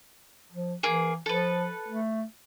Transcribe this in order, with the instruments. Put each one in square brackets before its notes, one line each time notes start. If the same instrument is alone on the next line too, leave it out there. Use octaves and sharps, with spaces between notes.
[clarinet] F3
[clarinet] E3 [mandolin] A#3 G#4
[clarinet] F3 [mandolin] A4 B4
[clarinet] A3